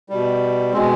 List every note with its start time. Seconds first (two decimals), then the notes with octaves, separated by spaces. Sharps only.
0.09 B2 G3
0.73 B2 G#3 C4